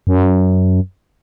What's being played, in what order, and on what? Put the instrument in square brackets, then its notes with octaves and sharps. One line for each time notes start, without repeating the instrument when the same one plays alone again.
[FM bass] F#2